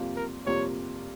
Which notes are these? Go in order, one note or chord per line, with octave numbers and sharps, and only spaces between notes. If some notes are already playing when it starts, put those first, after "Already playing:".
Already playing: F2 C3 G3 A#3 F4
A#4
F2 C3 G3 A#3 F4 C#5